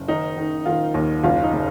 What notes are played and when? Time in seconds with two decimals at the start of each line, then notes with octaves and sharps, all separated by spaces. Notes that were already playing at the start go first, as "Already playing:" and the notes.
Already playing: F#1
0.08 D#3 D#4
0.37 D#3
0.65 D#3 F4
0.94 D#2
1.24 F#1 F4
1.43 D#4
1.53 C#3